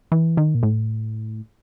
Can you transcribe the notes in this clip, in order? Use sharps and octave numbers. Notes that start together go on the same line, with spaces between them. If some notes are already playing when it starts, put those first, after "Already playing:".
E3
D#3
A#2
A2